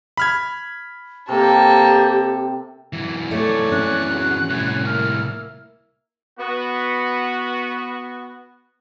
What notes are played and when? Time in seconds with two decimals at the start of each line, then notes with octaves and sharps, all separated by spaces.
0.17 B5 F6 G#6
1.28 C3 A#3 G4 A4
2.93 F#2 E3
3.31 A3 C#5 D5
3.72 C#4 F#6
4.10 F#4 G#4
4.50 C2 A2 G#5
4.86 A#3 E4 F6
6.39 B3 F#4